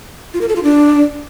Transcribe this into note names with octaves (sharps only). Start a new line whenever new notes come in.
F4
A#4
A4
F4
D4